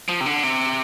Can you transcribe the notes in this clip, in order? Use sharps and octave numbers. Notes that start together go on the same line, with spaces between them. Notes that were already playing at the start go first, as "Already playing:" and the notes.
F3
C3
D3
C3